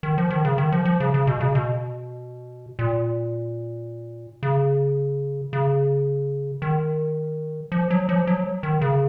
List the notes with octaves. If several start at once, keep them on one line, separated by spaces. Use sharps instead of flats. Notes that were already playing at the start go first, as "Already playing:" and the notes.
D#3
F3
D#3
C#3
D#3
F3
F3
C#3
C#3
B2
C#3
B2
A#2
C#3
C#3
D#3
F3
F#3
F3
F#3
D#3
C#3